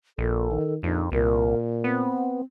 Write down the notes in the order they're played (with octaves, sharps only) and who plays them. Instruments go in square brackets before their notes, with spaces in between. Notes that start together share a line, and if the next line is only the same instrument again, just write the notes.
[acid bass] A#1 [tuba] A#2 [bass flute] A4
[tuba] D#3
[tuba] A#1 [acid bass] F2 [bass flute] D#4
[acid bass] C2 [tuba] A#2 [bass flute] A#4
[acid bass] B3 [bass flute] C4